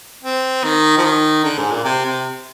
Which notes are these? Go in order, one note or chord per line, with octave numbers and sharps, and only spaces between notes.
C4
D#3
F3
D#3
D3
G#2
A#2
C3
C3